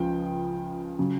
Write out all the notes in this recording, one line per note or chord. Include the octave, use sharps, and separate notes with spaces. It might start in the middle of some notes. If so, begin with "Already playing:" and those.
Already playing: C#2 C#3 F3 G5
C#3 F#3